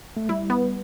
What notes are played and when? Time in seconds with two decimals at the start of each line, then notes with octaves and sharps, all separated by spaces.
0.17 A3
0.29 G3 E4
0.50 B3